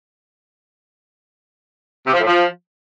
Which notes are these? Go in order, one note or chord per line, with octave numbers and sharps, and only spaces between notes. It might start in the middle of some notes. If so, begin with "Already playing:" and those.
C3
F3
A2
F3